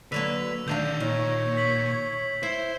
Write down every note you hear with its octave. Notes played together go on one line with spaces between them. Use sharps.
D3 F#3 A#3 B4 E6 F7
D2 D#3 D4 D5 F5 G6 F7
A#2 D#3 C#5
B6 F#7
E4 C5